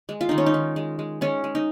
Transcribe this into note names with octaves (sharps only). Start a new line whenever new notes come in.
G#3
F4
D#3 D#4
C#4
D#4
D#3
G#3
G#3
G#3 C#4
G#3
D#4